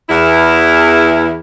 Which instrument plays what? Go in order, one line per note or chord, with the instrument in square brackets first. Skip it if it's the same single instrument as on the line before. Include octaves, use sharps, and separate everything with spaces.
[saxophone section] E2 E4